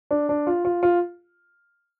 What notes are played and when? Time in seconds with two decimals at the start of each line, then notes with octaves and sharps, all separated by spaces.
0.11 D4
0.29 D4
0.47 F4
0.65 F4
0.83 F4